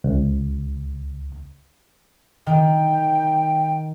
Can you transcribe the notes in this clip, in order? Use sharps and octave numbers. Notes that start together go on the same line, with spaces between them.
C#2
D#3 G5